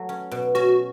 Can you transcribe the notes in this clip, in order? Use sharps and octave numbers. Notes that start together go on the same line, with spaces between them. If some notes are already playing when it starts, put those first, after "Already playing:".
Already playing: F#3 A3
C#4
B2
C#4 F#4